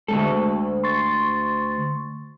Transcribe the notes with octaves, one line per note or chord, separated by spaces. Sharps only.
D2 G#2 G#3 A4
C6 C#6 A6